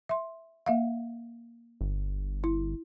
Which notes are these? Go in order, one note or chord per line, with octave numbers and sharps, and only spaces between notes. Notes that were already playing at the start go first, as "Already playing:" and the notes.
E5 C6
A#3 E5 F5
G1
E4